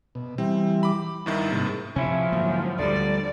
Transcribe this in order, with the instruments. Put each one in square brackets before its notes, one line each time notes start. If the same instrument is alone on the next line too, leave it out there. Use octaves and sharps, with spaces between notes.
[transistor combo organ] B2
[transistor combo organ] E3 G3 [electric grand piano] C4
[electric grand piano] B5 D6
[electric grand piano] G1 G2 D#3 [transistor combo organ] E4
[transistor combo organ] G#2 C3 A#3
[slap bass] C3 [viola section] F3 [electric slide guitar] C#4 E4
[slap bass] G#2 D3 A#3 [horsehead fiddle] F#3
[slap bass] D2 [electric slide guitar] D3 G3 [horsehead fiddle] D5